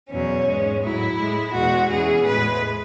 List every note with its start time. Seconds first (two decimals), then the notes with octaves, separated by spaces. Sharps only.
0.10 E2 B2 F#3 C#4
0.47 G#2 G#3
0.83 A2 F#3 E4
1.17 A2 G#3
1.53 E2 B2 G#3 F#4
1.90 E2 C#3 E3 G#4
2.26 A2 G#3 B4